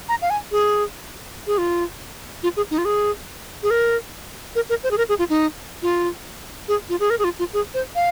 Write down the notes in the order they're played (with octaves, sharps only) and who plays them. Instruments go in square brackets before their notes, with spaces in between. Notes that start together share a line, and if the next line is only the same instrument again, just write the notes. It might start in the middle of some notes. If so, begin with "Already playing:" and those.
[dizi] A#5
F5
G#5
G#4
G#4
F4
F4
G#4
D#4
F4
G#4
G#4
A#4
A#4
A#4
C5
G#4
A#4
G#4
F4
D#4
F4
G#4
F4
G#4
A#4
G#4
F4
F4
G#4
C5
F5